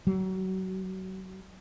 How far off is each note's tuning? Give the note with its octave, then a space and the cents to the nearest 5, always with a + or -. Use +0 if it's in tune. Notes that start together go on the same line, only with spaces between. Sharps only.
F#3 +30